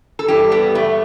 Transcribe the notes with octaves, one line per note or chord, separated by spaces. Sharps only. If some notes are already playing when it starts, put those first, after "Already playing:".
A4
G2 E3 G3 G4
B3
A3